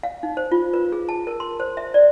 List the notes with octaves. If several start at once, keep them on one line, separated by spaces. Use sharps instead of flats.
F5
D#4
C5
F4
B4
G#4
A5
A#4
C6
C5
E5
D5